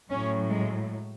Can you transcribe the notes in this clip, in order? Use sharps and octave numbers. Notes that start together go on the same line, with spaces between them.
A2 F#3 C#4
G#3